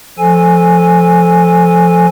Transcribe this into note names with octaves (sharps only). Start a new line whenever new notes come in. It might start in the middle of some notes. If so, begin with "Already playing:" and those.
F3 A4 G#5